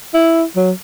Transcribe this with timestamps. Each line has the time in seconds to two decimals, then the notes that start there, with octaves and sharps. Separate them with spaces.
0.14 E4
0.56 F#3